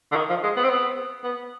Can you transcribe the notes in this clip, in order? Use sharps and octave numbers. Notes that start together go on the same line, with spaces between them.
D3
D#3
F3
G#3
B3
C4
B3
B3